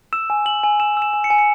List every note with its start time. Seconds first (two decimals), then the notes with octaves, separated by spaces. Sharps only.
0.13 E6 E7
0.30 G#5
0.46 G#5 F#7
0.63 G#5
0.80 E6 E7
0.97 E6
1.02 E7
1.13 G#5
1.24 C#7
1.30 G#5
1.38 C#7